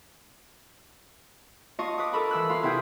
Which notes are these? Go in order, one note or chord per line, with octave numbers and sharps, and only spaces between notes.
F4 D#5 A5 C#6
B4 D6 D#6
A4 A#4 B5 C#6
E3 E6 F#6
F4 B4 C6
C3 E4 G#4 G5 D#6 G6